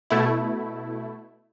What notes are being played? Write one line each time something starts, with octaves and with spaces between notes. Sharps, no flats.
B2 A3 E4